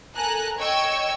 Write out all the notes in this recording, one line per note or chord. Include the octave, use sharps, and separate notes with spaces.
A4 A#4 G#5 A#5 F#6
C#5 D#5 G5 C#6 E6 G#6